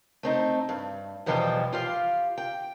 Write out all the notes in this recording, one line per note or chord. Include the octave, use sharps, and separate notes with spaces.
A3 C4 D#4
G2
E2 B2 E3 F3 G3 G5
F4 G4 F5
G5